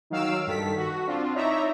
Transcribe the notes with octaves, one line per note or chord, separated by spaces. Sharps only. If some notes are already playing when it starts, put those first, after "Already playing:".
D#3 F#3 F5 E6 D7
G2 D#3 A4 B6
F#4
C4 D4 F4
D#4 E4 C#5 D5 E5 A#5